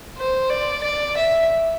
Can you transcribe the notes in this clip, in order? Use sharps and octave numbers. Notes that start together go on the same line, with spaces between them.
C5
D5
D5
E5